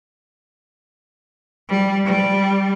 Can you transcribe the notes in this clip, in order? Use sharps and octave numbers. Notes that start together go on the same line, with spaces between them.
G3
G3